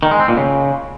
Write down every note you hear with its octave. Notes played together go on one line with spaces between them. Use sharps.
D#3
G#3
C4
A#2
C#3